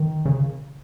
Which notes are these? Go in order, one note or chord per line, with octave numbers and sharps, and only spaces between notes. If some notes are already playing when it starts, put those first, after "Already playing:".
Already playing: D#3
C#3